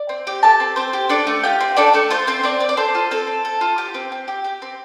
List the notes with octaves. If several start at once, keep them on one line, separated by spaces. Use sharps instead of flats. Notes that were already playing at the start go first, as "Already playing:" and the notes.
Already playing: D5
C4
G4
G4 A4 A5
C4
C4 C5
G4
D4 A4 D5
A3
F4 G4 G5
C4
D4 A4 D5
A3 A4
F4 C5
C4 C5
C4 D4 D5
C4
D5
A4 C5
F4
C4 A4
C4
A4
F4
G4
C4
C4
G4
G4
C4